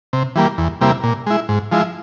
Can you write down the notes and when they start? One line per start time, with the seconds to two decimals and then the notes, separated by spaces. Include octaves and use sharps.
0.13 C3
0.36 E3 G3 A#3
0.58 E2
0.81 C3 G3 A#3 E4
1.03 A#2
1.26 G#3 E4
1.49 G#2
1.72 F3 G#3 E4